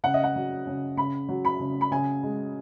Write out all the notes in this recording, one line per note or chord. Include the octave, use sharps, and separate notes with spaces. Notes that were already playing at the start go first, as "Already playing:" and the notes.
C#3 F#5
D#5
F#5
F#3
C#3
C#3 B5
F#3
B5
C#3
B5
C#3 G#5
G#3